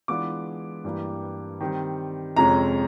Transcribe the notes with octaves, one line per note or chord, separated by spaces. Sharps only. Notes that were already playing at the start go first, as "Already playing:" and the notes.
E3 G#3 B3 D4 F4 D6
G2 E3 G3 A#3
D#3 G3 C4
F2 C3 F3 G#3 C#4 A#5